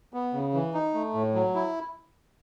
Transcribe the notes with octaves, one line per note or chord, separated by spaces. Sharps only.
B3
C#3
E3
D#4
A3
A2
F#3
E4